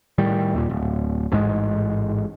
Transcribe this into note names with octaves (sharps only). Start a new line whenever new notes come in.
A2 D#3 G3
D#2 A#2
D1
A1 G#2 G#3